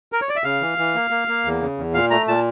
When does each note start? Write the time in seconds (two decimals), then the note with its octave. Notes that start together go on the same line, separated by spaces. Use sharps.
0.12 A#4
0.21 C#5
0.29 D5
0.36 E5
0.44 C#3 F5
0.61 E3
0.78 E3
0.95 A#3
1.11 A#3
1.28 A#3
1.45 E2
1.61 C#3
1.78 E2
1.94 A#2 F5
2.10 A3 A#5
2.28 A#2 A5